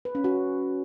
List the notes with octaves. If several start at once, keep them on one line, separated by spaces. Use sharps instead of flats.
B4
C#4
F#4